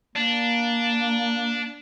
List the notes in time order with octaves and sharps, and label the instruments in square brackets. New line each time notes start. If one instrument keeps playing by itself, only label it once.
[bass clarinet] A#3 [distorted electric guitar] D4